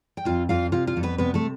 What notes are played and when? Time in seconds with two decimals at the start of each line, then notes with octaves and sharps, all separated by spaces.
0.17 G5
0.25 F2 F4 F5
0.49 F2 F4 F5
0.72 C3 F4 F5
0.87 F4 F5
0.96 F2 A4
1.03 B3 B4
1.18 C3 B3 B4
1.34 A3 A4